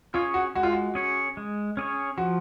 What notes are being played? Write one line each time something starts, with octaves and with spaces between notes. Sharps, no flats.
C#4 F4 G#4 C#5
F#4
G#3 F#4
F4
F#4
C#4 G#4 C#5
G#3
C#4 G#4 C#5
F3 F#4